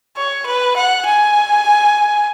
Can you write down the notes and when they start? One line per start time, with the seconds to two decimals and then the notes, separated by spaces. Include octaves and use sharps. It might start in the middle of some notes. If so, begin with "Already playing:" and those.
0.17 C#5
0.46 B4
0.76 F#5
1.05 G#5